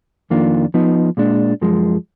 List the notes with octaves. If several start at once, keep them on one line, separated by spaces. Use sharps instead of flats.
F2 D#3 A#3 D4 F4
F3 B3 D#4
A#2 G#3 D4
F#2 F3 G#3